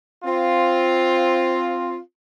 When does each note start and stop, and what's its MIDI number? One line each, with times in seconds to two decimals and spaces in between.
0.25 1.97 60
0.25 1.97 65